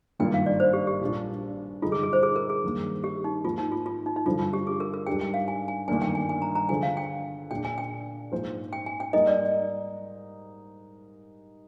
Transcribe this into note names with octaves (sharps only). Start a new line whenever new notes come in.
G#1 G2 D#3 A#3 F4 G5
F5
D5
C5
G4
G4
A#1 A#2 G3 D4 F4
G2 D3 G#3 D#4 F4
G#4
G#4
C5
G#4
A#4
G#4
G2 D#3 A#3
G4
D#4
G#2 F3 A#3 F4
D#4
F4
F4
D#4
D#4
G2 D3 F3 F4
F4
G4
G#4
A#4
A#4
G#2 G3 D4 G4 G5
G5
F5
G#5
G#5
G1 G2 D#3 A#3 D4 G#5
G5
G#5
G#5
A#5
A#5
D3 F3 G#3 G#5
F5
G5
A#2 G#3 D4 G5
G#5
G5
G#2 F3 A#3 F4 C5
G5
G#5
G5
G#2 G3 A#3 D#4 A#4 D#5
D5